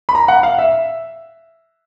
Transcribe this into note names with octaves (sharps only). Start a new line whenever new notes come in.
B5
A#5
F#5
F5
E5